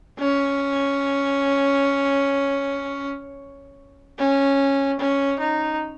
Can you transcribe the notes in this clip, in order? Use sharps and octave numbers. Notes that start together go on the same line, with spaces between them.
C#4
C#4
C#4
D#4